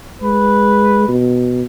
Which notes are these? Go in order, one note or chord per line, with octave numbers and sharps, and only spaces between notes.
G#3 B4
B2